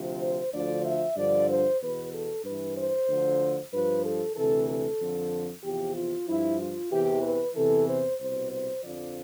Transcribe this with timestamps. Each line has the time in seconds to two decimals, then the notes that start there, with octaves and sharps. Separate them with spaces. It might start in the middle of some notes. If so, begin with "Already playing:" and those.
Already playing: D2 C3 F3
0.21 C5
0.53 D2 D3 F3 D5
0.85 E5
1.16 G2 D3 F3 D5
1.49 C5
1.81 E2 B2 B4
2.13 A4
2.44 G2 E3 B4
2.76 C5
3.08 D2 D3 F3
3.72 G2 F3 B4
4.04 A4
4.36 D2 C3 E3 A4
4.68 A4
5.00 F2 D3 F3
5.63 E2 C3 F3 G4
5.96 F4
6.28 G2 F3 E4
6.59 F4
6.91 E2 C3 E3 G4
7.23 B4
7.55 E2 C3 E3 A4
7.88 C5
8.19 C2 B2 C5
8.51 C5
8.83 F2 D3 F3 D5